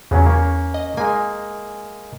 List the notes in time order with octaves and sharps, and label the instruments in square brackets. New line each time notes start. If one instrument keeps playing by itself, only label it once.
[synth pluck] E2 [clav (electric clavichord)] C#3 F#3 C#4
[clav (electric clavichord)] A#3 C#4
[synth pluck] D#5
[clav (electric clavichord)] G#3 A#3 [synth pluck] G#5